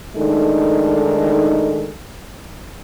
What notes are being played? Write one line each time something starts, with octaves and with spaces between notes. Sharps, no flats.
A2 D#3 G#3 D4 D#4 A4